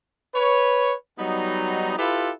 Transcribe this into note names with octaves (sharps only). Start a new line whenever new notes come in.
B4 C#5
F#3 G3 B3 D#4
E4 F4 G4 A4 B4